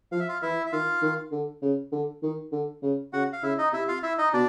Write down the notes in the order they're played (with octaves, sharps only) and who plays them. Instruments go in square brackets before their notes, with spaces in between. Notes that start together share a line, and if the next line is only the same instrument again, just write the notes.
[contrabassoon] F3 [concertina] F5
[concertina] E5
F4 F5
[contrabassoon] E3 [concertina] E4 E5
[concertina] E5
[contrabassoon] D#3 [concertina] F4 F5
[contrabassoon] D#3
D3
C#3
D3
D#3
D3
C#3
[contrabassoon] C#3 [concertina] F#4 F#5
[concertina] F5
[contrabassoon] C#3 [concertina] E4 E5
[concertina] D#4 D#5
[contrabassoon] C3 [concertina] E4 E5
[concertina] F4 F5
E4 E5
D#4 D#5
[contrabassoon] B2 [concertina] D4 D5